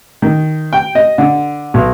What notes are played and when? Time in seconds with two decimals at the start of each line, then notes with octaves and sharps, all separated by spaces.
0.22 D#3
0.73 G5
0.95 D#5
1.18 D3
1.74 B1